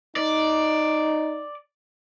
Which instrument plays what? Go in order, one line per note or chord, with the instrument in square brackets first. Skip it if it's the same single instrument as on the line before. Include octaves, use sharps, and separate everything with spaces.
[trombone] D#4 [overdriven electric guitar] D5